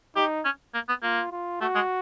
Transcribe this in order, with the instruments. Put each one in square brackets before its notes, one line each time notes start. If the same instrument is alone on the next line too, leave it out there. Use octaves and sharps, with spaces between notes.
[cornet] D#4 [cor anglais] G4
[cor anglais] C#4
A#3
B3
[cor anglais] A#3 [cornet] F4
[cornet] F4
[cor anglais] A3 [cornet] F#4
[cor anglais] G#3